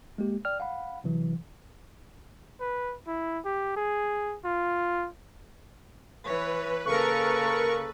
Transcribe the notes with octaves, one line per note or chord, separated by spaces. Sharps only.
G#3 A#3 G4
D5 G5 F6
F5 F#5 B5
C3 E3 F#3
B4
E4
G4
G#4
F4
E3 B4 C#5
C#3 A#3 A4 A#4 C#6